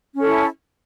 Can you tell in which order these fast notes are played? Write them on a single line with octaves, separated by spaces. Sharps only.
C#4 A4 E4